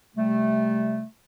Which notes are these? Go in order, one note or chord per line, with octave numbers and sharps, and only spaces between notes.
C3 G3 A3